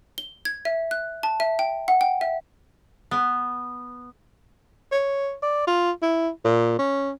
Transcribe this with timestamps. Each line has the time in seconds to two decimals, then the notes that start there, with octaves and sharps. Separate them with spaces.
0.18 G7
0.45 G#6
0.65 E5
0.91 F#6
1.23 A5
1.40 E5
1.59 G5
1.88 F#5
2.01 G5
2.21 E5
3.11 B3
4.92 C#5
5.42 D5
5.67 F4
6.02 E4
6.44 A#2
6.79 C#4